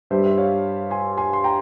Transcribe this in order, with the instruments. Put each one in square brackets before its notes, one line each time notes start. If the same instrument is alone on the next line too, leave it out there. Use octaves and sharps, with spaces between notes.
[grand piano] G2 G3 C5 E5
E5
C#5 F5
G#5 C6
G#5 C6
C6
G5 A#5